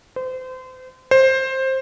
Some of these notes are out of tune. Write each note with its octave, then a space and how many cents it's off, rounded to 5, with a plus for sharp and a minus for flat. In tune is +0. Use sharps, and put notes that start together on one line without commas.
C5 -30
C5 +15